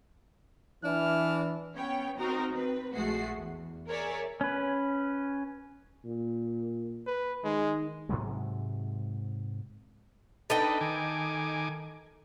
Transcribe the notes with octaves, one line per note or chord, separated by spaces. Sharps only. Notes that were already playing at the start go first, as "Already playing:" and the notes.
E3 D4 E4 F6
B3 C#4 C#5 G5
C4 D#4 F#4 A#4 A#5
C4 B4
A#1 G#3 A3 F#4 C7
E2
G#4 A#4 C#5 D5 E5 G#5
C#4 B4
A#2
B4
D#3 G#3
G#2 C3 F#3 G#3
D4 D#4 A4 B4 D#5 G5
D#3 G#5 D6